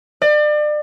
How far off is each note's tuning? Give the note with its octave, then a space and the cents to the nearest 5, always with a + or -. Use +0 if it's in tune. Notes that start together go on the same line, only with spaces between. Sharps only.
D5 +35